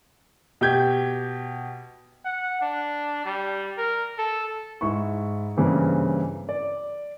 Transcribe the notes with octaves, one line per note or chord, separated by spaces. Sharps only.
B2 G4 G6 G#6
F#5
D4
G3
A#4
A4
G#2 E4 C#6
G2 C#3 E3 A#3 C4
D5